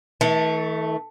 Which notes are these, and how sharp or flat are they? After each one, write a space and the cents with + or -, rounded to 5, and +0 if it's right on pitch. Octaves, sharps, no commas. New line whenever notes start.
E3 -45 A3 +0